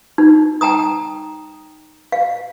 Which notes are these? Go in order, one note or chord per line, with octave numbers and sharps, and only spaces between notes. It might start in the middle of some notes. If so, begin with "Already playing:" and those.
D#4
G5 A5 A#5 D#6
F5